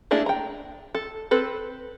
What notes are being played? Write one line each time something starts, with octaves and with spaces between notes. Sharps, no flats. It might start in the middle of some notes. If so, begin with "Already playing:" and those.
A3 A#3 D4 E4 G#4
G5 A#5
A4
C4 A4 B4